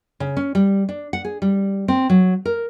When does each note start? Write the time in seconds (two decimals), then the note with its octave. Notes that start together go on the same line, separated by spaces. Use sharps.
0.20 C#3
0.37 C#4
0.55 G3
0.89 D4
1.13 F#5
1.25 G#4
1.42 G3
1.88 C4
2.10 F#3
2.45 A#4